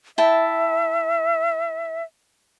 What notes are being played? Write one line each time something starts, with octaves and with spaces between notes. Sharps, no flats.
E4 E5 G5 A5